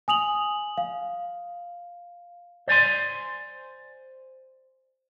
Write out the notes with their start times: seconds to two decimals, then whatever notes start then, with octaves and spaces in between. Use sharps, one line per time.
0.08 G#5 D#6 F7 F#7
0.77 F5
2.68 C5 D5 G#5 C6